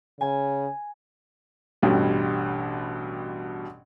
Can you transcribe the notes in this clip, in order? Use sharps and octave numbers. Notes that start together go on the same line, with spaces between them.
C#3 G#5
A1 G2 B2 G3